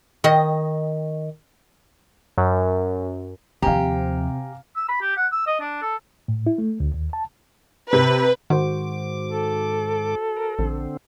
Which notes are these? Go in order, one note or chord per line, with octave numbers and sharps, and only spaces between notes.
D#3 D#5
F#2
D#2 C3 F3 G4 F5 G#5 A#5
E6
B5
G4
F#5
E6
D#5
D4
A4
A2
E4
A3
D2
D#2
A5
C3 B4
G#2 D#3 F#4 C5 D6
A4
A#4
A#1 D3 C4